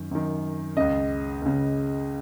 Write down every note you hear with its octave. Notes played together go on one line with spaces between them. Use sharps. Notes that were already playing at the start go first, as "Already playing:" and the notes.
Already playing: F#2 D#3
F#2 D#3
C#2 C#3 D#5
C#2 C#3